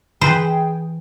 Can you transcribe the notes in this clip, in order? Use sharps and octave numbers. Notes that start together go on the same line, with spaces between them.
E3 G#4 B4 C5 G5